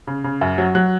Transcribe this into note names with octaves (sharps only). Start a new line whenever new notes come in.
C#3
C#3
F#2
F#3
F#3 F#6